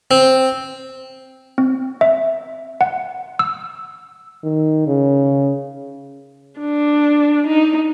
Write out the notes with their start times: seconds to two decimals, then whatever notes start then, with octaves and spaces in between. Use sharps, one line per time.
0.11 C4
1.58 C4
2.01 E5
2.81 F#5
3.39 E6
4.44 D#3
4.87 C#3
6.59 D4
7.47 D#4